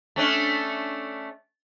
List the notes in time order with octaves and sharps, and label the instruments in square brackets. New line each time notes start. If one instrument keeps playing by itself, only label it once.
[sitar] A3 C#4 D4